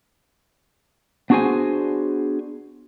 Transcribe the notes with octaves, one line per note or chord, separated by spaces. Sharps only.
B3 D4 F#4 G#4 C5 G#5